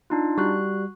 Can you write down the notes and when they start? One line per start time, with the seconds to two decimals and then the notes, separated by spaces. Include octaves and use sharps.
0.10 D4 D#4 F4
0.38 G3 F#4 F#6